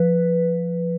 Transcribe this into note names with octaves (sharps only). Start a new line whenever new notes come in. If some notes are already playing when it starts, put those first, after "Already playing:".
Already playing: F3 B4